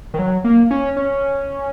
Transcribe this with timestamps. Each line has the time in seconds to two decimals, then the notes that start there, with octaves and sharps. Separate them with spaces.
0.14 D#3
0.19 F#3
0.44 A#3
0.71 C#4
0.96 C#4